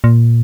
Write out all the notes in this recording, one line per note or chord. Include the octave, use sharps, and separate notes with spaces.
A#2